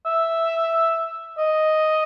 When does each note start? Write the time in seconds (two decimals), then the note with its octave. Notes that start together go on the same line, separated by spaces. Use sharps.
0.06 E5
1.38 D#5